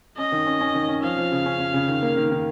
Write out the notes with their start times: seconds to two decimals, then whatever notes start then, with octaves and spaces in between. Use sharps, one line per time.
0.18 C#4 D#5
0.32 D#3
0.46 C#4
0.61 C#4
0.75 D#3
0.89 C#4
1.03 F3 F5
1.18 F3
1.32 C#3
1.46 C#4
1.59 C#4
1.74 C#3
1.88 D#3
2.02 A#3
2.17 D#3
2.31 D#3